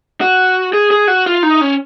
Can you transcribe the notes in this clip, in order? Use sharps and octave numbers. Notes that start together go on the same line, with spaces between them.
F#4
G#4
G#4
F#4
F4
D#4
C#4